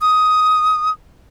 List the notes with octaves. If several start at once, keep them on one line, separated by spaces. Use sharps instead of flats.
D#6